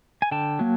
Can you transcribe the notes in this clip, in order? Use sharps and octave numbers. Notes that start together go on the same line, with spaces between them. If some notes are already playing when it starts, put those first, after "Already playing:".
G#5
D3 G5 A5
F#3 A#3